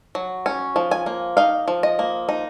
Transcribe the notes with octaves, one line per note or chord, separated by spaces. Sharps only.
F#3
C#4
F3
G#5
A#3
D#4 F5
F3
D#5
A#3
D#4